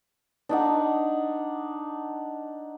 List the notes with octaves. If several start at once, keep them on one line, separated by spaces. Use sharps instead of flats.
D4 D#4 F#5